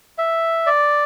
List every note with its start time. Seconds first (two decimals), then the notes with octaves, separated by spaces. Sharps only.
0.18 E5
0.66 D5